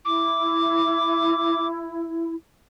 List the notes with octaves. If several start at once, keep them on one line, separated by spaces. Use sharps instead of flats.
E4 D6